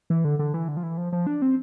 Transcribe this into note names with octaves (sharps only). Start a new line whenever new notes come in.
E3
D3
D3
E3
D3
F3
E3
F3
F3
D4
C4